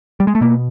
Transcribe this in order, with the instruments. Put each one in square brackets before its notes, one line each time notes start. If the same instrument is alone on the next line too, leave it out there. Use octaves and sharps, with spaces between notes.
[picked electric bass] G3
G#3
A3
B2 A#3